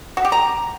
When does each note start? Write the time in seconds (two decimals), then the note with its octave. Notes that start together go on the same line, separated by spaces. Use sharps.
0.17 F#4
0.25 G4
0.32 A#5